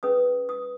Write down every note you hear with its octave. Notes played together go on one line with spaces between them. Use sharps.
C#4 G#4 B4 D#6
D#6